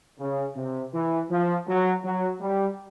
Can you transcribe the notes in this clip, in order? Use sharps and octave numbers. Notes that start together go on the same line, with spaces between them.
C#3
C3
E3
F3
F#3
F#3
G3